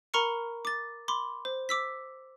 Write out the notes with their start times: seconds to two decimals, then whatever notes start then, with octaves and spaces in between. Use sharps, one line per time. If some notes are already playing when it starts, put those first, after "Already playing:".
0.14 A#4 A#5 B5 C#6 F6 C#7
0.65 D6 A6
1.08 B5 C6 D6
1.45 C5
1.69 D6 E6 B6